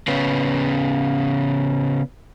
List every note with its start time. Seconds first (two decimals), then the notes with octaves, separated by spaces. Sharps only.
0.08 C#3 B3